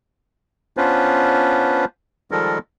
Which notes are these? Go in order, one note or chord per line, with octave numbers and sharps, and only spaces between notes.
B3 C#4 D4 F4 B4 C5
D#3 F3 G3 G#3 A4 A#4